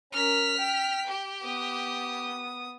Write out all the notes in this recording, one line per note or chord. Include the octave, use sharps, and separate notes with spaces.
C#4 A#4 F6 B6
G5
G4
B3 D#6